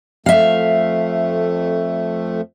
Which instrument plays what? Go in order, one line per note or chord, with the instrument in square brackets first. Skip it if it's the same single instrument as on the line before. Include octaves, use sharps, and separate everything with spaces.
[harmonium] F2 A3 [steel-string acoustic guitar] E5 F5